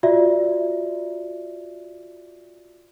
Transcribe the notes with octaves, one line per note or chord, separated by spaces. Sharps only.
F4 F#4 D5 E5